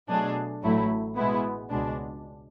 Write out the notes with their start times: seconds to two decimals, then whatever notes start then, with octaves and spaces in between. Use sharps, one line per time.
0.09 B2 F#3 A3 D4 G#4
0.62 A1 A2 F#3 A3 E4
1.16 B2 G#3 B3 E4
1.70 C#2 B2 G#3 D4